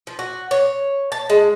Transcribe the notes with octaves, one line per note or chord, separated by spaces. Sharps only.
F3
F#4
C#5
A5
G#3